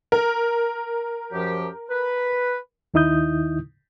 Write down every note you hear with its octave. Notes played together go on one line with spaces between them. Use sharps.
A#4
F#2 F3 G4
B4
D#2 D#3 D#4 E4 D#6 G6